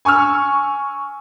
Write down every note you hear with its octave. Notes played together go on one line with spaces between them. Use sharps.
G#5 C#6 E6 F6